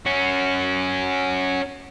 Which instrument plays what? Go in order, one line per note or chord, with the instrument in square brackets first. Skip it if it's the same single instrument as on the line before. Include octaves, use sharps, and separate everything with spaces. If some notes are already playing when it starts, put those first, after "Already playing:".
[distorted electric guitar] C#4 F#4